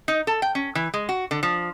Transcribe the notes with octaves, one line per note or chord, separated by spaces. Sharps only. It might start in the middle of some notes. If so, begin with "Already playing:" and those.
D#4
A4
G5
C#4
E3
G#3
F#4
D3
F3